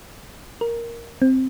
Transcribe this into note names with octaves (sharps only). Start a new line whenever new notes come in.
A#4
C4